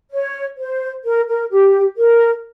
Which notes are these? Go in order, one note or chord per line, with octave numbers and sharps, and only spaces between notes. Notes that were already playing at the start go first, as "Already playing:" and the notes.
C#5
C5
A#4
A#4
G4
A#4